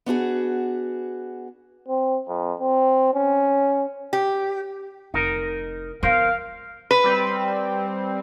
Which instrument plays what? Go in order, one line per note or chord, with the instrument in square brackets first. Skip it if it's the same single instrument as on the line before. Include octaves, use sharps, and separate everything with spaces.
[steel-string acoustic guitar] B3 D4 F#4 G#4
[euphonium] C4
F2
C4
C#4
[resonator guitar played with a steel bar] G4
[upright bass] F1 [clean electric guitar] D#4 A#4
[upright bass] F3 B3 [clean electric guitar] A#4 C5 [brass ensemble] F5
[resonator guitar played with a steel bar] B4
[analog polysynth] G3 C4